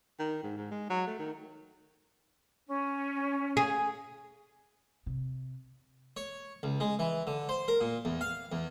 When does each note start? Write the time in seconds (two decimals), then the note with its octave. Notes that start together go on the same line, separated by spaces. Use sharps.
0.19 D#3
0.43 G#2
0.57 G#2
0.71 G#3
0.90 F#3
1.07 A3
1.19 D#3
2.68 C#4
3.57 G#4
5.06 C3
6.17 C#5
6.63 C#2
6.80 G#3
6.99 E3
7.27 D3
7.49 C5
7.68 A#4
7.81 A#2
8.05 E2
8.21 F5
8.52 E2